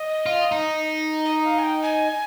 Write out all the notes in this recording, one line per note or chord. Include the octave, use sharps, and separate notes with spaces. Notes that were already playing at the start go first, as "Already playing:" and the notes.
Already playing: D#5
F4
D#4
D#5
F5
G#5
G5
G#5